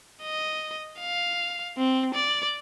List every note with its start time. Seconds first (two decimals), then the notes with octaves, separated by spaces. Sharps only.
0.22 D#5
1.00 F5
1.77 C4
2.15 D5